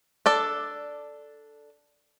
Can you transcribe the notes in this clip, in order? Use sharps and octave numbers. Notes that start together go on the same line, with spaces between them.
D4 A4 D5